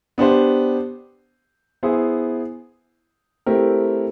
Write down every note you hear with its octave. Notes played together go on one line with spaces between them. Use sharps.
B3 D4 G4 C5
B3 E4 G#4 C5
A3 C4 E4 G4 A#4